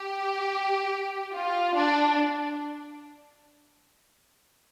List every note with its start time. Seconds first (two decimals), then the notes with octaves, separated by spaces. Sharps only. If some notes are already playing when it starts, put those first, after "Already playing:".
Already playing: G4
1.34 F4
1.75 D4